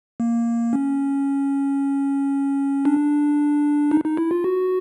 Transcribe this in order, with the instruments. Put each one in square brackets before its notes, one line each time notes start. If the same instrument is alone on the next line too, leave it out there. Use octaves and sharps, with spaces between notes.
[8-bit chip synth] A#3
C#4
D4
D#4
D#4
E4
F4
F#4